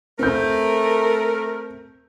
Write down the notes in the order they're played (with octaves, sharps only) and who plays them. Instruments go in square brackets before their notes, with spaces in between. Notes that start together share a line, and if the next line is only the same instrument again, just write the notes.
[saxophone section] A3 A#4 [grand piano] C4 G6